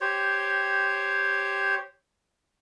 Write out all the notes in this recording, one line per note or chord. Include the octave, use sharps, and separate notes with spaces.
G4 C5 C#5